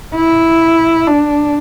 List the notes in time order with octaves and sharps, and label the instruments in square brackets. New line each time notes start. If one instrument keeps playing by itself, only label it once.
[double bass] E4
D4